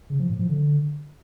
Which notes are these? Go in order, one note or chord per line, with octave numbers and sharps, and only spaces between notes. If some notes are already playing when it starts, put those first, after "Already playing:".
C#3
F3
A2
F3
D3